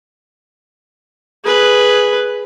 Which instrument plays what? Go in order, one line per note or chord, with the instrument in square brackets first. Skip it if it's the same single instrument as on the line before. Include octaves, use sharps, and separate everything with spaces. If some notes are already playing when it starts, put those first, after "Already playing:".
[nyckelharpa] G#4 B4